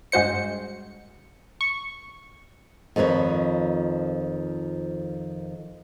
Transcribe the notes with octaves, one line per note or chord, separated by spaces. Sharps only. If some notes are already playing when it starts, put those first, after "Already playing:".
G2 G#3 F#4 C5 C#7
C#6
F2 D#3 F3 B4 C#5